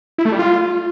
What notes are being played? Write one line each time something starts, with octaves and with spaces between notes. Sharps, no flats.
E4
A3
G3
F4